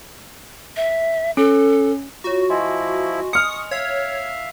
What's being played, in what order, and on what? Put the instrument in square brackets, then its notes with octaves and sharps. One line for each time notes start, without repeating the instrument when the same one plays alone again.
[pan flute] E5
[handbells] C#4 [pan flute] A4
[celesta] F4 C#5 [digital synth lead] F#4
[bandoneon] F3 E4 [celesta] D#5 G#5 C6
[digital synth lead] D#6 [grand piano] F6 C#7
[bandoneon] C#6
[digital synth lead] C#5 [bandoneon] E5 F5